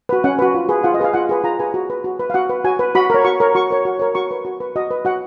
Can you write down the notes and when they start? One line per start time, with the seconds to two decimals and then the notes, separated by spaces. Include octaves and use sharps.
0.09 F#4 B4
0.24 C#4 F#5
0.39 F#4 B4
0.55 F4
0.69 G#4 B4
0.84 F4 F#5
0.94 D#5
1.00 G#4 B4 F5
1.14 F4 F#5
1.29 G#4 B4
1.44 F4 A#5
1.59 G#4 B4 G#5
1.74 F#4
1.90 B4
2.04 F#4
2.19 B4
2.30 F5
2.34 F#4 F#5
2.49 B4
2.64 F#4 G#5
2.79 B4
2.95 F#4 B5
3.10 A#4 C#5
3.24 F#4 C#6
3.40 A#4 C#5
3.55 F#4 C#6
3.71 A#4 C#5
3.85 F#4
3.99 A#4 C#5
4.15 F#4 C#6
4.31 B4
4.45 F#4
4.60 B4
4.76 F#4 D#5
4.91 B4
5.05 F#4 F#5